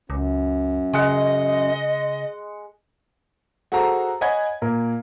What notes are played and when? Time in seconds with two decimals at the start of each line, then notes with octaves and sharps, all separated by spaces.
0.10 C#2 F#2
0.93 C#3 G#3 D#5 F#5
3.72 F#4 G#4 A4 C5 A#5
4.21 C#5 D#5 F#5 G#5 B5 G#6
4.62 A#2 A#4